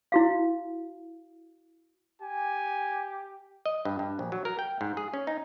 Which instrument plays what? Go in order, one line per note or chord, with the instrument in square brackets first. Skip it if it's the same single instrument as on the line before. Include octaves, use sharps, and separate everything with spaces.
[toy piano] E4 F#4 F5
[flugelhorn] G4 [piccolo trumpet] G#5
[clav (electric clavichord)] D#5
G2
G2
A#1
F#3
A#4
G5
G#2
G#4
C#4
D#4